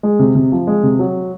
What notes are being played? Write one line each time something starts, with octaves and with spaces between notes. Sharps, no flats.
G#3
C3
C3
F3
G#3
C3
F#3